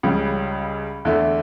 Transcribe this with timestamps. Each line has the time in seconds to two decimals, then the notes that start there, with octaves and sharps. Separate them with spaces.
0.03 C#2 C#3 G3 C#4
1.05 E2 D3 A3 E4